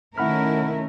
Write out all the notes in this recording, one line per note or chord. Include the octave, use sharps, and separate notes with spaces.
D#3 A3 C#4 E4 A#4 F#5 B5 F6